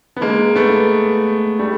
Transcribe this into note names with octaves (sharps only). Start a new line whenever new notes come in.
B3
G#3 A#3
A3 B3
G3 A3